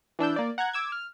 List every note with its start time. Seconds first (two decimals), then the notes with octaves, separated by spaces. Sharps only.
0.19 E3 D4 E6 G6
0.36 A#3 D5
0.58 F#5 A#5 F#6 G#6
0.73 D6 E6 G#6
0.92 F6